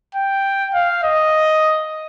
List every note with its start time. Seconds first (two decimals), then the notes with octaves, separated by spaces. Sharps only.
0.15 G5
0.74 F5
1.04 D#5